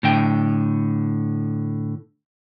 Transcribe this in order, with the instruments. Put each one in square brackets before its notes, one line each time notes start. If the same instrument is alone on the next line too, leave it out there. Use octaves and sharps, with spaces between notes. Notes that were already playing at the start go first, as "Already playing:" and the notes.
[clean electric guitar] A2 D3 G5